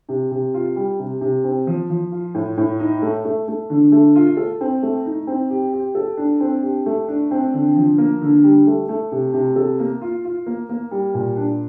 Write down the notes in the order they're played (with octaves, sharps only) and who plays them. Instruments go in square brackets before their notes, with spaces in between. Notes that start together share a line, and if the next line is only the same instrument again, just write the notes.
[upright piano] C3
C3
F4
G3
C3
C3
C4
F3
F3
F4
A2
A2
D#4
A3
A3
A3
D3
A3
F4
A4
C4
A3
D#4
C4
G4
G4
A4
D4
C4
G4
A3
D4
C4
D3
F3
A#3
D3
G3
A3
A3
C3
C3
A4
A#3
F4
F4
A#3
A#3
G3
A#2
D4